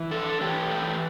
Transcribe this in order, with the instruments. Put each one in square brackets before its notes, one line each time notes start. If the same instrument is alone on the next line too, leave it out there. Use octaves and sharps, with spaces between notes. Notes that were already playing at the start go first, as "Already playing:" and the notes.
Already playing: [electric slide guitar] E3
D4 A4
E3 G4
A3